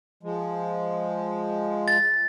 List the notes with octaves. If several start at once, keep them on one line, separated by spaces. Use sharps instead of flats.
F3 G#3
A6